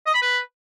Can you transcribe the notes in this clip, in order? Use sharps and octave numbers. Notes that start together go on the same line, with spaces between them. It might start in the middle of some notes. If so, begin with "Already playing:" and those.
D#5
B5
B4